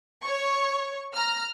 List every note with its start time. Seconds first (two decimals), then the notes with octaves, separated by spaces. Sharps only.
0.23 C#5 C#6
1.14 A#5 F6